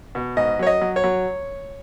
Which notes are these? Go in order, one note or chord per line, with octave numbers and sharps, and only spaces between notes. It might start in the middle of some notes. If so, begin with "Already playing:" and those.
B2
G#2 D#5
F#3 C#5
D#5
F#3
C#5
F#3